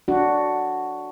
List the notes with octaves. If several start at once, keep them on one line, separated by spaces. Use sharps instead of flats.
D4 F#4